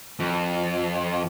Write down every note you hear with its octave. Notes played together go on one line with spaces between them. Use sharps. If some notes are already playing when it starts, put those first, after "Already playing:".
F2